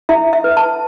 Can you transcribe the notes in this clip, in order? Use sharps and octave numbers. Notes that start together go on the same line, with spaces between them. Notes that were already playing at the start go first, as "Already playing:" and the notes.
E4 E5
E5
B4
A5